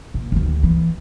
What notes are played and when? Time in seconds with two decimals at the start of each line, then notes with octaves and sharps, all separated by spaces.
0.14 A#2
0.32 D2 D#3
0.63 E3